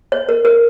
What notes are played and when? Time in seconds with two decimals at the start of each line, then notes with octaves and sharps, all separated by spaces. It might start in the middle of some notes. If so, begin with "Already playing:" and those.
0.12 C#5
0.29 A#4
0.45 A#4